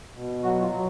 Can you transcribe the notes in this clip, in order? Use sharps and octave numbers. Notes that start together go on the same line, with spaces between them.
B2
F#3 F#4
F4
F#3